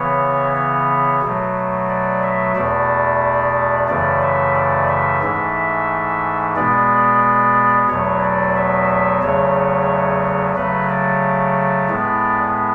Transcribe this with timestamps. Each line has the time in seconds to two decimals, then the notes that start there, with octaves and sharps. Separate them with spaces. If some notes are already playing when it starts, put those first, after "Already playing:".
Already playing: C#3 E3 B3 C#5
0.56 C#5
1.22 B2 F#3 A3
1.89 D5
2.23 E5
2.56 E2 B2 A3 D5
3.88 F#2 C#3 E3 A3 D5
4.22 E5
4.55 D5
4.88 E5
5.23 G#2 E3 A3
6.56 B2 G#3 B3 D5
7.89 E2 B2 F#3 A3 C#5
8.23 D5
8.56 E5
8.89 E5
9.22 E2 C#3 F#3 A3 C#5
10.56 C#3 F#3 A3 B4
10.89 D5
11.90 A2 G#3 B3